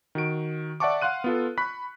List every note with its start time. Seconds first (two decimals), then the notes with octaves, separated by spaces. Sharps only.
0.15 D#3 F#4 D7
0.80 D5 E5 F#5 A5 C#6 D6
1.02 F5 F#5 C6 F#6 D#7
1.24 B3 F4 A4
1.58 B5 C#6 F#6 B6